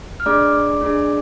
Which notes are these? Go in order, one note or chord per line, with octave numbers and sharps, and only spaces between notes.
F6
A3 D4 G#4 D5 D6
A3 D4 G#4